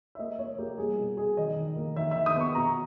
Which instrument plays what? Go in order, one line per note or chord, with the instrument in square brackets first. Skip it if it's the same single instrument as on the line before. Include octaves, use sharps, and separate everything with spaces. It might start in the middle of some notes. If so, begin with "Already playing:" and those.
[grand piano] E5
A#3 D#5
A#3 C#5
A#3 G4
G3 G#4
B2
B2 G#4
D#3 D#5
D#3
A#3
D#3 E5
D#3 E5
D#6
B3 C#6
B2 A#5